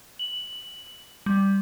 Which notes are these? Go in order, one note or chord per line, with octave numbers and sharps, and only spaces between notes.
F#7
G3